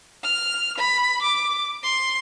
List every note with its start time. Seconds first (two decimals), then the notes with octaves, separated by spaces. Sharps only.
0.24 F6
0.78 B5
1.22 D6
1.83 C6